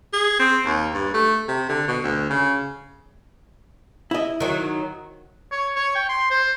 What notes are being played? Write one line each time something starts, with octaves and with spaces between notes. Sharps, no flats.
G#4
C4
D#2
G2
A3
C3
D3
B2
D2
C#3
E4 D#5
D#3 F#3
C#5
C#5
G5
C6
C5